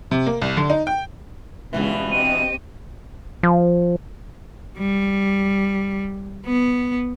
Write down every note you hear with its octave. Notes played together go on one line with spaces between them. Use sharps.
C3
A#3
C2
D3
D#4
G5
C#2 G2 B2 E3
C4 G4 D#5 D#7
F3
G3
B3